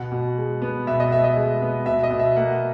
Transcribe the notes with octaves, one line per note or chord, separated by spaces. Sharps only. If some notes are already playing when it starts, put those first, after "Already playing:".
Already playing: B2 F#5
B2
G#3
B3
B2 E5
D#5
B2 E5
D#5
G#3
B3
B2 E5
D#5
B2
E5
A#3 F#5